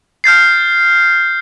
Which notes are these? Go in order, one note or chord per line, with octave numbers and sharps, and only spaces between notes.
F6 G6 A6 C7